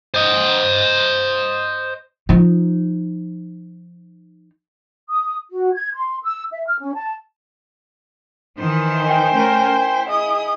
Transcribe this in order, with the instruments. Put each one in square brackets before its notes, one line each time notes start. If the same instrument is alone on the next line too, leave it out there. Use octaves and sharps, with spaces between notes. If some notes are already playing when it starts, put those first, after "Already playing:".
[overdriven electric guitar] C5 D#5
[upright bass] F3 D#4
[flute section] D#6
F#4
G#6
C6
E6
E5
F6
C#4
A5
[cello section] D#3 E3 [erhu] C5
[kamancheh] G5 G#5
[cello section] A3 C#4 A#4
E4
[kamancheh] G#4 D#5 [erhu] D#6